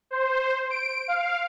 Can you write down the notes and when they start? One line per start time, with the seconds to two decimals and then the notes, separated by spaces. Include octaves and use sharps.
0.11 C5
0.70 D7
1.08 F5